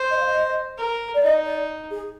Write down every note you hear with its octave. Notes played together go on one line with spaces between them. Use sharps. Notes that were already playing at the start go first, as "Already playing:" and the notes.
Already playing: C5
D#5
F5
D#5
A#4
D5
D#4 D#5
D5
G#4